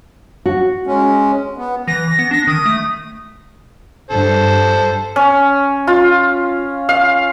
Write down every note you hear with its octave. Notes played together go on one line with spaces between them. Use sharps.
F#4
G#3 C#4
B3
E3 A#6
B3
D4 A#6
D#3 D#6
A3
G2 A4 C5
C#4
F4
F5